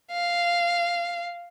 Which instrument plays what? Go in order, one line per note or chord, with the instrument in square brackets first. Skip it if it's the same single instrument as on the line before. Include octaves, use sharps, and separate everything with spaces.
[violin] F5